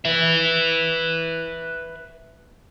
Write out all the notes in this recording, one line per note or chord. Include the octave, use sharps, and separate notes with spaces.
B4 E5